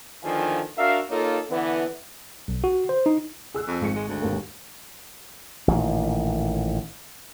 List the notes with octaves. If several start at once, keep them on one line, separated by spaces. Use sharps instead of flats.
E2 D3 D#3 F3 F5 G#5
D4 F#4 A#4 E5 F5
A#3 D#4 F4 A4 C#5
D3 E3 B3
B1
F#4
C5
D#4
G#4 E6 F#6
F2
G#1 G#4 C#7
G#3
D2
G#1 D#2 A#3
A1 A#2 D#3